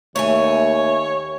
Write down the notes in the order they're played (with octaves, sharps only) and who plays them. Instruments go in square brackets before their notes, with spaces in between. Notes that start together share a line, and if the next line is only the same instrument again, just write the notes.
[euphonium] D#2 [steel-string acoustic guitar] A3 E5 G#5 [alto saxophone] C#5